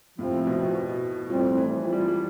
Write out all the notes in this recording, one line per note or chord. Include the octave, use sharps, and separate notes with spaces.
A2 C3 F3 C4 E4
B2
B2
A2 F3 G3 C4
E3
F3
G3
F3
G3